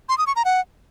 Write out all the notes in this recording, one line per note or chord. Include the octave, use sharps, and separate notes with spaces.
C6
D#6
C#6
A#5
F#5